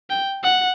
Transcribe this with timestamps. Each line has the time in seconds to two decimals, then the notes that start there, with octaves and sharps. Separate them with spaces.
0.10 G5
0.44 F#5